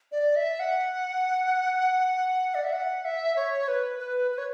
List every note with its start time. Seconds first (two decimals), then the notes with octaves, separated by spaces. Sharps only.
0.12 D5
0.36 E5
0.60 F#5
2.55 D5
2.64 E5
2.73 F#5
3.05 E5
3.36 C#5
3.68 B4
3.99 B4
4.31 B4
4.38 C#5